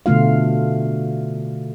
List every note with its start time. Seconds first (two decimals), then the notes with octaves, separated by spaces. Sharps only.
0.06 B2 D3 A3 F4 F5